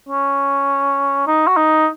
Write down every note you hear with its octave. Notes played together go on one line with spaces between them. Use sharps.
C#4
D#4
F#4
D#4